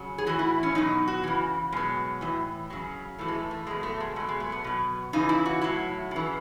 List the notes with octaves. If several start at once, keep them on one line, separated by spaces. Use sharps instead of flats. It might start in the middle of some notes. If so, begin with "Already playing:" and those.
Already playing: C#3 F#3
G#4
A2 E3 F#4
E4
C#4
B2 F#3 D#4
F#4
C#3 E3
B2 F#3 G#3
A2 E3
C#3 F#3
A2 E3 A3
G#3
A3
A3
B2 F#3 G#3
A3
G#3
B2 F#3 A3
G#3
A3
B3
B2 F#3
C#3 E3 D#4
E4
F#4
A2 F#3 E4
C#3 E3